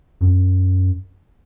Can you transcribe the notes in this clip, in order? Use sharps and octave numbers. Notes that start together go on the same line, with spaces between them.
F#2